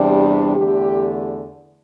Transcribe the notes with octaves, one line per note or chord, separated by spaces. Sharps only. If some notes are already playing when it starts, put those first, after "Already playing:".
Already playing: E2 C3 G3 D4
G4
E2 D3 A3 G4